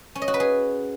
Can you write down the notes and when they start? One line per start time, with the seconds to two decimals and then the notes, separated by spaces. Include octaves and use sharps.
0.15 C#4
0.22 D#5
0.28 F#4
0.34 B4
0.40 G#4